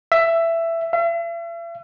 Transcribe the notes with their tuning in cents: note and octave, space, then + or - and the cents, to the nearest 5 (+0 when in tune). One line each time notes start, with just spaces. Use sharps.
E5 +15
E5 +45